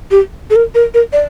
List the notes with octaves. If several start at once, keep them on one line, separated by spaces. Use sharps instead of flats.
G4
A4
A#4
A#4
A#4
D5